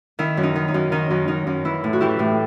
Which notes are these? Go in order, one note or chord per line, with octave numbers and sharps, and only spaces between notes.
D#3 E4
F#2
D#4
D#3
D#4
F#2
D#3 D#4
F#2
D#3 D#4
F#2
E3 E4
A2
F#4
E3 E4 G4
A2